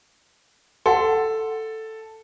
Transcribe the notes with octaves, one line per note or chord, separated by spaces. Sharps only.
A4 F#5 G5 C6